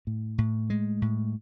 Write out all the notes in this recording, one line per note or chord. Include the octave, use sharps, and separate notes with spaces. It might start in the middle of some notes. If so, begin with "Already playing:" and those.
A2
A2
G#3
A2